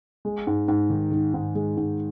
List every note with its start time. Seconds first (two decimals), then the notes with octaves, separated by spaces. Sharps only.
0.25 G#3
0.47 G#2
0.68 G#2
0.90 D#3
1.11 D#3
1.34 G#2
1.55 G#3
1.77 G#2